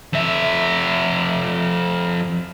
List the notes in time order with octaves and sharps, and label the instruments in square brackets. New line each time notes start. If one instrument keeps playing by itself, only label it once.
[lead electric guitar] F2 E5